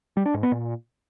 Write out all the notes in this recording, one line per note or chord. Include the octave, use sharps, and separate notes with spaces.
G3
D4
G#2
B3
A#2